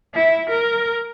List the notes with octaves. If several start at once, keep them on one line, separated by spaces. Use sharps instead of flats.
E4
A#4